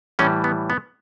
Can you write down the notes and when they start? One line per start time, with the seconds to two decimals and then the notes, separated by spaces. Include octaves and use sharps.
0.19 A2 E3 G3 C#4
0.44 B3
0.70 B3